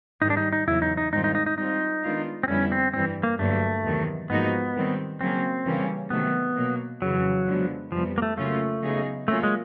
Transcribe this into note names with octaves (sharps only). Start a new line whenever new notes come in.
G#2 D#3 G3 D#4
D4
D#4
D#4
E2 C#3 F#3 E4
D#4
D#4
G#2 D#3 G3 C4 D#4 F4
D#4
D#4
D#4
G3 C4 D#4 F4
D#3 G#3 B3 D4 F4
C4
F2 D3 G3 B3 C#4 E4
C4
G2 E3 G3 C4
A#3
G2 D3 F#3 A3 A#3
E2 C3 D#3 F#3
G#2 F3 A#3 B3 D#4 F#4
D#3 G3 C4
C#3 F#3 A#3 C4 C#4
C#3 E3 G3 A#3 C#4
C3 D#3 F#3 A3 B3
B2 F#3 A#3
F2 C#3 E3 F#3
D3 F3 G#3 B3
F2 C3 E3 F3 G3 B3
A#3
A3
C#3 F#3 A3 A#3 C#4 F4
C#3 F#3 B3 D#4 G#4
F#3 A3 A#3 C#4 F4 A#4
G#3